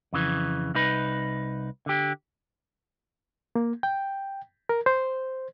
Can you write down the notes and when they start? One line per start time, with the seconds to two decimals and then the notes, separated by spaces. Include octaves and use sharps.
0.13 F2 C#3 E3
0.75 C2 D#4 B4
1.86 D3 G4
3.55 A#3
3.83 G5
4.69 A#4
4.86 C5